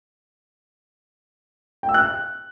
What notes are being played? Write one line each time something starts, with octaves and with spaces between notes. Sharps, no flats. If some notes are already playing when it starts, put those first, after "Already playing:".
G5
E6
F#6